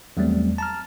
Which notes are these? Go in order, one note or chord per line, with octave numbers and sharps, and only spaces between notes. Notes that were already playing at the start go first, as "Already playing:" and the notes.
E2 F#3 G3 A3 C4
A5 A#5 F6